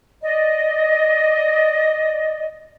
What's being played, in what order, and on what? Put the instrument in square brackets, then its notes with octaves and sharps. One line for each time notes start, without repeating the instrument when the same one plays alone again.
[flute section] D5 D#5